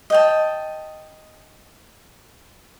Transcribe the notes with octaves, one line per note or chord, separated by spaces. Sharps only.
D#5 G5 A5